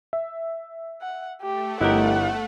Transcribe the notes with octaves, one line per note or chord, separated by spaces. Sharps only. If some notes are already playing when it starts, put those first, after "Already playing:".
E5
F#5
A3 G4
G1 E4 G4 A#4 D#5 F#5 F#6